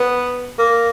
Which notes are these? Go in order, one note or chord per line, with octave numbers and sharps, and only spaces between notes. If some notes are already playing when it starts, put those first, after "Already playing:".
Already playing: B3
A#3